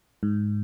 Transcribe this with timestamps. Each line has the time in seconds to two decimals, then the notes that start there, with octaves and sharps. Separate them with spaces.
0.23 G#2